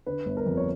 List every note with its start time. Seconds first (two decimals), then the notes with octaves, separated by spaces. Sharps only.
0.06 D3 B4
0.26 G1
0.37 A#4
0.46 F2
0.57 C#5